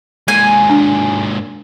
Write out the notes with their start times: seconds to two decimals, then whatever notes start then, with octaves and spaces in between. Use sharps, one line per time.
0.28 G#2 A#3 G#5
0.70 D4